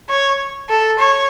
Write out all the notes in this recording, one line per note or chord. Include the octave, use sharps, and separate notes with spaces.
C#5
A4
C#5